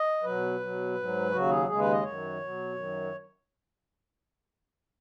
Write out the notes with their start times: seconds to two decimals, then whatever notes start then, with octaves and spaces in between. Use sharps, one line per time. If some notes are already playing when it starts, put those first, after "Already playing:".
Already playing: D#5
0.23 B2 F#3 B4
0.60 B2 F#3
0.95 G#2 F#3
1.31 D#2 C#3 F#3 F#4
1.49 G#4
1.67 D#2 C#3 G#3 G#4
1.79 B4
1.91 D#5
2.03 F#2 D#3 F#3 C#5
2.39 B2 F#3
2.75 F#2 D#3 F#3